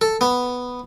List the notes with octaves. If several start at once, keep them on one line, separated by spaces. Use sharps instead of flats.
A4
B3